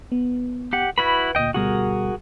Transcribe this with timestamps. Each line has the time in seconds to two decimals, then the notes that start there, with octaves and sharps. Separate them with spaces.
0.12 B3
0.73 G4 F#5
0.98 E4 F#4 B4 B5
1.35 D2 A#2 D#5 G5
1.54 D2 B2 G3 F#4 G#4 A#4